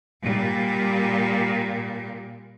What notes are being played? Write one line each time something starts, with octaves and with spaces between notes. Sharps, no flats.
A#2 G3